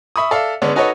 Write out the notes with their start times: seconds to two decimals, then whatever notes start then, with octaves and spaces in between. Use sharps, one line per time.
0.16 E5 B5 C#6 D#6
0.31 A4 D5 E5 F5
0.62 D3 G#3 B3 C#4 D4 C#5
0.76 D#4 F#4 A4 B4 C#5 D#5